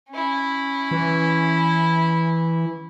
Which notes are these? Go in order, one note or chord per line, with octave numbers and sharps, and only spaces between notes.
C#4 E4
E3